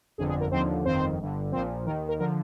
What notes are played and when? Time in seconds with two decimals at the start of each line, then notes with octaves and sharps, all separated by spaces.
0.18 G1 F2 D3 G#4
0.29 G#4
0.40 A#4
0.51 D#2 D3 F3 C4 C5
0.85 G1 F2 D#3 C4 C5
1.19 G1 G2 D3
1.52 A#1 A#2 F3 C4 C5
1.86 D#2 D#3 A#4
2.08 A#4
2.20 D3 F3 A#4